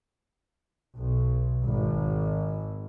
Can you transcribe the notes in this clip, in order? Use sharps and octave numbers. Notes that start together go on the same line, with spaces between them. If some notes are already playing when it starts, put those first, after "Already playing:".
B1
G#1